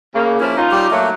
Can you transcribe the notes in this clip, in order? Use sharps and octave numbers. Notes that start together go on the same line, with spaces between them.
C#3 A#3
F3 A#3 C#4 E4
D#4 F4
G3 G4
F#3 A3 A#3